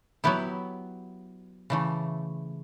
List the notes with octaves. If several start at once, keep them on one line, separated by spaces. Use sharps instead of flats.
F#3 B3 E4 G4
C#3 E3 A3